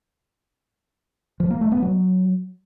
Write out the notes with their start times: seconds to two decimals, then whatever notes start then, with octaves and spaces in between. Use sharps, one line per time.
1.40 F3
1.51 A#3
1.61 A3
1.72 B3
1.82 F#3